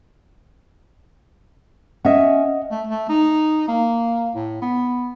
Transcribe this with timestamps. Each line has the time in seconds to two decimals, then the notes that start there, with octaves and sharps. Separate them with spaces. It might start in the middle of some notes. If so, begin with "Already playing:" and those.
2.05 C#4 D#5 E5 F#5
2.71 A3
2.87 A3
3.09 D#4
3.68 A#3
4.35 A2
4.62 B3